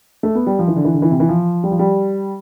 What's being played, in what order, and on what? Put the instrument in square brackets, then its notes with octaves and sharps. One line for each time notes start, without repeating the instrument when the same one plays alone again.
[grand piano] A3
B3
G3
F3
E3
D3
E3
D3
E3
C3
E3
F3
G3
F3
G3